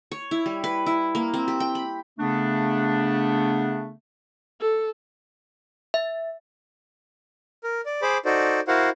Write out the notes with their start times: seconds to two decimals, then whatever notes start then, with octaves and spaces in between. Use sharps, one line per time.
0.12 C#5
0.31 E4
0.46 G3
0.64 B4
0.86 E4
1.15 A#3
1.34 C4
1.48 G4
1.60 G5
1.75 B5
2.19 C#3 A3 B3 D4
4.60 A4
5.94 E5
7.64 A#4
7.86 D5
8.02 G#4 C5 B5 D6
8.25 D#4 F#4 A4 C5 D5
8.68 E4 F#4 A#4 C5 F5 F#5